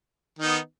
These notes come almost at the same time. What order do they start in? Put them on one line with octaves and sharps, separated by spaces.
D#3 D#4 B3